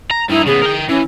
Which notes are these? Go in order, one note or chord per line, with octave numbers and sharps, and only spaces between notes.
A#5
G2 D#4 E4
C#3 B3 G#4
A#4 G5
E3 C#4